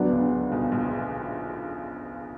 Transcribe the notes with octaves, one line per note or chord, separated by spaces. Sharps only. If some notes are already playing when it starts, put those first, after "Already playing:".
Already playing: D2 D3 F#3 B3 D4
C#2 C#3
B1 B2
A#1 A#2